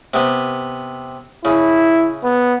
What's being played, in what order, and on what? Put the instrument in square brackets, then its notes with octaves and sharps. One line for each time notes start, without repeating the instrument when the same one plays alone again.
[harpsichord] C3 B3
[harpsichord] C#3 [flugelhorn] E4
[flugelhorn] B3